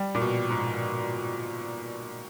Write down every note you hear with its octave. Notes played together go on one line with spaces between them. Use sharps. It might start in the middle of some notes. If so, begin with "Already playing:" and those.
Already playing: G3
A#2
B2
G#2